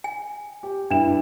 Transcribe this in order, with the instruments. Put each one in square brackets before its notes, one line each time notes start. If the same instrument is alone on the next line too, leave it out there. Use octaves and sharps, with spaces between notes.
[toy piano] G#5
[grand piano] G4
[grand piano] G2 E4 E7 [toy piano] D4